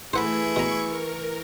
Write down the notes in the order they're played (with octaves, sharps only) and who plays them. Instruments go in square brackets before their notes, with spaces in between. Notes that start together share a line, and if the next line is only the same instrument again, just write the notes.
[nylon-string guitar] E3 [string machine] A3 [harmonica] E4 G#4 [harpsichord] C5 F#5 B5
[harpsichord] B2 A#5 [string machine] C#6
[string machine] A#4